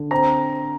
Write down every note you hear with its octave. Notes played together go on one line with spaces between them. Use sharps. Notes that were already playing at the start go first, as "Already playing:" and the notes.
Already playing: D3
C4 A#5